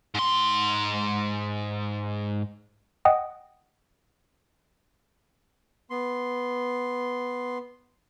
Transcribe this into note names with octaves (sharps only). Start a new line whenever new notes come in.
G#2 C6
D#5 F#5 G5 D#6
B3 C6